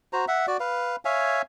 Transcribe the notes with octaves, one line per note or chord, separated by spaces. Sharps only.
F#4 C5 A#5
E5 F#5
F#4 D5
B4 F5
C#5 E5 F5 G#5